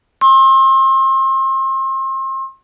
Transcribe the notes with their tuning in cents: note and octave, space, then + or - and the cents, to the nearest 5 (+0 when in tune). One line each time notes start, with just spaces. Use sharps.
C6 +35 E6 -20